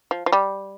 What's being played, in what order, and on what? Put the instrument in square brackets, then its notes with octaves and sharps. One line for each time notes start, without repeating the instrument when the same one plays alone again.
[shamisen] F3
F3
G3